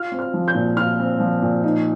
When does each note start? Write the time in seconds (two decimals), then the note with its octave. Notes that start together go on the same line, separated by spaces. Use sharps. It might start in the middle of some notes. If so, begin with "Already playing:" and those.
Already playing: F4 F6
0.12 C4
0.19 F6
0.34 F3
0.48 G6
0.55 A#2
0.77 F4 F6
0.99 C4
1.20 F3
1.42 A#2
1.64 D#4